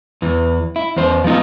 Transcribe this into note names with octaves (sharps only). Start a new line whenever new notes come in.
E2 E3
E4
E2 C5
F3 B3 D#4 F4